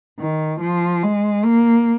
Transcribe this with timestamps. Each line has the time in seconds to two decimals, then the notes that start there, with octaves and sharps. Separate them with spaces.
0.19 D#3
0.61 F3
1.03 G#3
1.45 A#3